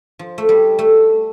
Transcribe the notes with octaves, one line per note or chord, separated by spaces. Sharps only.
F3
A3
G3
A3